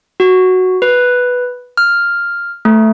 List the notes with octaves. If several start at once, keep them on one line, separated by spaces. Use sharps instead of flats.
F#4
B4
F6
A3